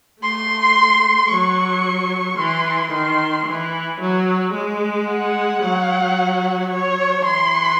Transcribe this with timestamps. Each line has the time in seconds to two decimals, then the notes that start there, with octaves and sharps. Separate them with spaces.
0.22 A3 C6
1.30 F#3 C#6
2.38 E3 C6
2.92 D#3 C6
3.47 E3
4.01 F#3
4.54 G#3
5.08 F#5
5.62 F#3
6.70 C#5
7.24 E3 C6